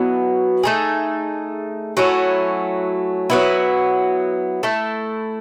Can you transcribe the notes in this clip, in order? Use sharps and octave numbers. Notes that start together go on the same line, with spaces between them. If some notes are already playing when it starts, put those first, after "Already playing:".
Already playing: B2 F#3 B3 E4
A3 D#4 G#4
F#3 A3 C#4 E4
F#3 B3 E4
A3 E4 A4